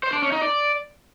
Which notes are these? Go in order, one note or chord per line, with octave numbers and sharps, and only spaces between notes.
C5
D4
C#4
D#4
D5